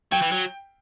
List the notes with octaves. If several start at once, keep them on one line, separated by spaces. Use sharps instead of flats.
F#3 G5
E3
F#3